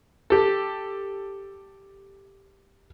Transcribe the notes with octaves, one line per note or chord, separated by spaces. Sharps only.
G4 A4